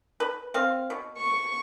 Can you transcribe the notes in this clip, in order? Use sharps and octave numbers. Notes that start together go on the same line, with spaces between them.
B4
C4 F5
B2
C#6